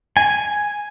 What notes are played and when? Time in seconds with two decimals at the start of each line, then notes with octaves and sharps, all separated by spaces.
0.17 G#5